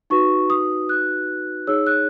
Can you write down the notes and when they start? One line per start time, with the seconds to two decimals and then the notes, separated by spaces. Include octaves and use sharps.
0.10 D#4 F#4 B4 C#6
0.50 D#6
0.89 F#6
1.67 D#4 G#4 C#5 E6
1.87 F#6